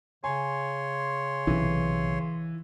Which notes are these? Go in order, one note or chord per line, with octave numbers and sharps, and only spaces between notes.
C#3 C#5 G#5 C6
B1 C3 E3